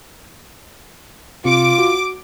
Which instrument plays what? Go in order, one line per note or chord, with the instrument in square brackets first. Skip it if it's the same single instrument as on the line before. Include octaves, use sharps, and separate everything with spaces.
[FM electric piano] C3 C#7 [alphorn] F4 [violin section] D6
[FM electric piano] F#4